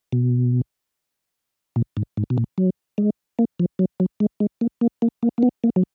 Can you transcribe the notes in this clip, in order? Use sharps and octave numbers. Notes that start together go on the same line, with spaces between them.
B2
A#2
G#2
G#2
B2
A#2
F#3
G#3
A#3
F3
F#3
F#3
G#3
G#3
A#3
A#3
A#3
A#3
A#3
B3
A#3
F#3